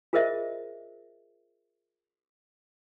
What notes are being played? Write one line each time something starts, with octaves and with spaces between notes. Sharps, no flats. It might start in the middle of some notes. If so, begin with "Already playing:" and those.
F4 G#4 A#4 C5 D#5 E5